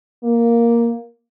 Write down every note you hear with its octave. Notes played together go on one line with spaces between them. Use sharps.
A#3